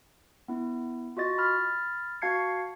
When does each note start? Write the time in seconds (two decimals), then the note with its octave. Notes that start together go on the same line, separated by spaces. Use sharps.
0.48 B3 E4
1.17 F4 F#4 D#5 A6
1.38 B5 F6 A6
2.22 F#4 F5 A5 G#6 C7 C#7